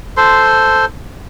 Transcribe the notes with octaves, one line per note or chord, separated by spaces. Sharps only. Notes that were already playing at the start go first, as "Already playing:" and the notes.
A4 C5 C6